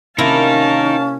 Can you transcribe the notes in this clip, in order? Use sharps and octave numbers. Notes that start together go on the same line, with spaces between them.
C3 A#3 C#4 D#4 E4 A#4 F5 A5